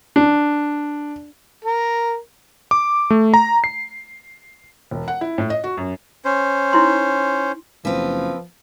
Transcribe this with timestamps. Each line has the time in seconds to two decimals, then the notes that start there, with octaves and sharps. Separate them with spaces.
0.16 D4
1.65 A#4
2.71 D6
3.10 A3
3.34 A#5
3.64 C7
4.91 E1
5.08 F#5
5.21 E4
5.38 A2
5.50 D#5
5.64 F#4
5.77 F#2
6.25 C#4 C5
6.73 D#4 E4 C6
7.85 F#1 F3 C4 B4